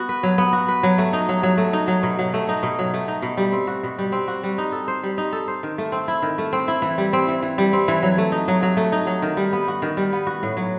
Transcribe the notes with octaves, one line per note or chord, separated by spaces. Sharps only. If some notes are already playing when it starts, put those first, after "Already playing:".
Already playing: B3 F#4
B4
F#3
B3
F#4
B4
F#3
A3
D#4
F#3
F#3
A3
D#4
F#3
B2
F#3
A3
D#4
B2
F#3
A3
D#4
B2
G3
C4
F#4
B2
G3
C4
F#4
G3
D#4
A4
C5
G3
D#4
A4
C5
D#3
A3
C4
E4
D#3
A3
C4
E4
E3
G3
C4
E3
E3
G3
C4
E3
F#3
A3
D#4
F#3
F#3
A3
D#4
F#3
D#3
G3
B3
F#4
D#3
G3
B3
F#4
A2
F#3